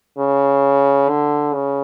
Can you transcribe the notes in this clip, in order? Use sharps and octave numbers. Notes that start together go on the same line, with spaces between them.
C#3
D3
C#3